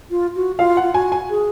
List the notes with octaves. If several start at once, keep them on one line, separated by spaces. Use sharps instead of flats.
F4
F#4
F4 F5
F#5
F4
F#4 G#5
G#5
G#4